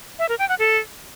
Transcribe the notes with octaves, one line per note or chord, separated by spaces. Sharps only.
E5
A#4
G5
F#5
A4